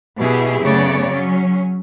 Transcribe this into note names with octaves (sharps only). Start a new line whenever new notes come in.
B2 B3 E4 G4 G#4
F#2 C#3 A3 B3 C#5 D5
F#3 C#4